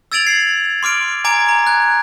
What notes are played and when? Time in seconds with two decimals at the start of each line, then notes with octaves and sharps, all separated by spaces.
0.12 E6 G#6 A6 D7 F7 F#7
0.26 G#6 C7
0.83 C6 D6 F6 D7
1.25 G#5 A#5 D6 G#6 D7
1.49 A#5
1.67 F#6 G#6